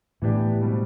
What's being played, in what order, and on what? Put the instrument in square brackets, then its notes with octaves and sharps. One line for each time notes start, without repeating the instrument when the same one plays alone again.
[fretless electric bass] A2 [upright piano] E3 B3 D4 G4
[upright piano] B2 G3 C4